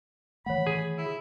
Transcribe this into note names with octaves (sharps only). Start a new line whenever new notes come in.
D#3 E3 A3 C#5 F#5 B5
G#4
E4